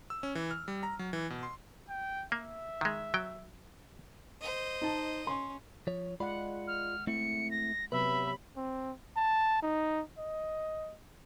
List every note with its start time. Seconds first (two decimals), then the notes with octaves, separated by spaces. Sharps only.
0.10 E6
0.23 C#4
0.35 E3
0.51 F6
0.68 G3
0.83 A#5
0.99 F#3
1.13 E3
1.30 B2
1.43 C6
1.89 G5
2.32 A#3 E5
2.81 D#3 G#3
3.14 F#3 G5
4.41 C5 D#5
4.82 D#4 A5
5.27 C#4 C6
5.87 F3 C#5
6.20 G#3 F4 D5 F#5 B5
6.67 F6
7.07 A3 C4 E4 C#7
7.51 A#6
7.92 C3 F#3 B3 B4 E5 B5
8.56 C4
9.16 A5
9.62 D#4
10.18 D#5